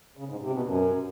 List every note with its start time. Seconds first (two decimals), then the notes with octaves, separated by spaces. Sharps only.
0.17 C#3
0.29 G#2
0.41 C3
0.53 B2
0.65 F#2